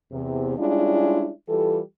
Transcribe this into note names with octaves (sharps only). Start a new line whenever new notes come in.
E2 C3
G3 G#3 C#4 D4 E4 F4
E3 G3 F4 G4 A4